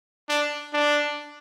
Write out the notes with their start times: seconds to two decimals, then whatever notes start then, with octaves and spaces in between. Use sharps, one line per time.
0.29 D4
0.73 D4